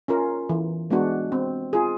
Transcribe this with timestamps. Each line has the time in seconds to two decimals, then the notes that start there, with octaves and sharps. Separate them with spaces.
0.08 C#4 F4 A#4
0.49 E3
0.90 G#3 B3 D4 F#4
1.32 C4
1.73 F4 G#4